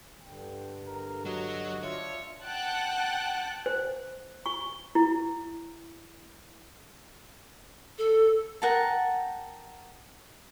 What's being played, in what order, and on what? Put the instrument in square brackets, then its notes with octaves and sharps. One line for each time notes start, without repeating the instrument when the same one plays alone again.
[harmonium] G2 D3 [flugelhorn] G5
[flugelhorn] A#4
[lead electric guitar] F#3 [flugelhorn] F#4 [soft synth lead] D#5
[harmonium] D4 [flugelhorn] F4 [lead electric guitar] C#5 [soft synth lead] E5
[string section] F#5 G5 A5 F#6
[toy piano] C5
C#6
E4
[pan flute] A4
[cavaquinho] A#4 F#5 G5 A5